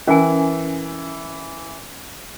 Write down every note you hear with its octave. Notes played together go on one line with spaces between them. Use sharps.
E3 C#4 A#4 G#5